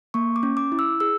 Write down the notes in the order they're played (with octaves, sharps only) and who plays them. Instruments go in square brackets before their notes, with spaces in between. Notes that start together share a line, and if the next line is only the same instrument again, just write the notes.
[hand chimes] A#3 C#6
D6
C#4
D6
E4
E6
G#4 E6